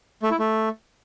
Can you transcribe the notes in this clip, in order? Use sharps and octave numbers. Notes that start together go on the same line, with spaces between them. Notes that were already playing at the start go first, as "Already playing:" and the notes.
A3
E4
A3